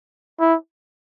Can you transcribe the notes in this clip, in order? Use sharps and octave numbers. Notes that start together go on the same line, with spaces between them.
E4